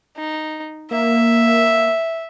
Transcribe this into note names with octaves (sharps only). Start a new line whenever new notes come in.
D#4
A#3 E5